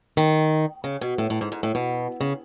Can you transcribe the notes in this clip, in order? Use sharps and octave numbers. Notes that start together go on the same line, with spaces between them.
D#3
C#3
B2
A2
A2
G#2
G#2
A2
B2
C#3